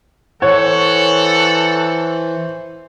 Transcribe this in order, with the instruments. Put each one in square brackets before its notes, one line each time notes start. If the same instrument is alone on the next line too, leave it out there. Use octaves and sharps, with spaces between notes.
[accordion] E3 [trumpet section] A4 F#5 [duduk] C5 [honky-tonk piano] C#5